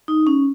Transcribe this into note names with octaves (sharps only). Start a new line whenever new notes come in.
D#4
C#4